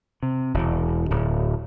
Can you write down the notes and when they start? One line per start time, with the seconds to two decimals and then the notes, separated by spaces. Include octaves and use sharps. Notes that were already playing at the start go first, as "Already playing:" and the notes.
0.23 C3
0.54 E1
1.10 D1